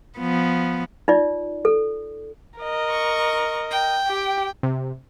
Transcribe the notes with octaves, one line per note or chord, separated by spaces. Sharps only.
F3 B3
D#4 F4 D5
A4
A#4 D#5
C#6
G5
G4
C3